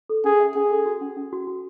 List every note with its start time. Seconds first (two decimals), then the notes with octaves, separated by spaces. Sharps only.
0.10 A4
0.24 C#4 G#4
0.40 E5
0.55 C#4 G#4
0.71 A4
0.86 F#4
1.01 C#4
1.17 C#4
1.33 F#4
1.47 F#4